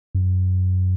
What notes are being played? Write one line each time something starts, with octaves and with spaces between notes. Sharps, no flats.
F#2